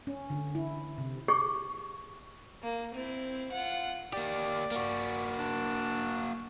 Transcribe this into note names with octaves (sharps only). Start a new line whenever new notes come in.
C#4
D3
E4
C3
G4 G#4 C#6
A#3
C4 E4
F4 F#5
A#3 G4 D5
A#3 F#4
D4